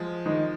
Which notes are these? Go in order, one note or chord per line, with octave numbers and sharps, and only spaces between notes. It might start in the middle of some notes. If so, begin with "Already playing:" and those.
Already playing: F3 G#3
D#3 G#3 D#4